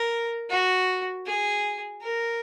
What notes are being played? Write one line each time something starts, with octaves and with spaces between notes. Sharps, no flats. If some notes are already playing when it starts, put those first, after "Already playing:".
Already playing: A#4
F#4
G#4
A#4